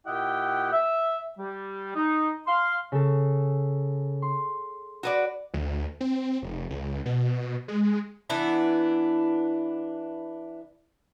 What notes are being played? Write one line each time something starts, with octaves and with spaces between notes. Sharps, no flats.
A#2 E4 G4 D#5 F#5 G5
E5
G3
D#4
F5 C6
C#3 A4
C6
F#4 B4 D5
D2
C4
F1
C#2
B2
G#3
E3 B3 D4 E4